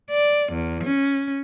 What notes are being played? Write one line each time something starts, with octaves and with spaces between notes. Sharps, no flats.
D5
E2
C#4